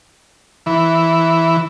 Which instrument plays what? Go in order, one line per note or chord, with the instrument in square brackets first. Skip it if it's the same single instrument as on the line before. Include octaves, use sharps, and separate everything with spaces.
[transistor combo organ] E3